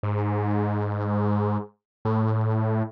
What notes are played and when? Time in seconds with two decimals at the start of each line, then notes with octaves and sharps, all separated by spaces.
0.03 G#2
2.05 A2